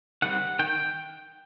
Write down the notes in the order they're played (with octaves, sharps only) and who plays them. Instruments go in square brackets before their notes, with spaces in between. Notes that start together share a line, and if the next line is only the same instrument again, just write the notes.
[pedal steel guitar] D#3 G3 C4 F#5
D#3 G5